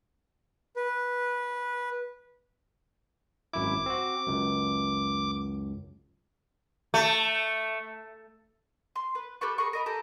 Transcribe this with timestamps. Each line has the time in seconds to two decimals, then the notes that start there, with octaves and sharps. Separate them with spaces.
0.76 B4
3.53 G#1 F#2 E4 D6
3.86 C4 F#4
4.27 C#2 F#2
6.94 A3
8.96 C6
9.15 B4
9.41 G4 A4 B4 C#6
9.58 G#4 A#4 B5 C#6
9.73 A#4 D#5 B5
9.86 G4 A4 A#5